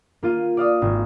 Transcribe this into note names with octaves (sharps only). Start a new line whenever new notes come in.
A#3 F4 D#7
D5 F5 D#6
G#1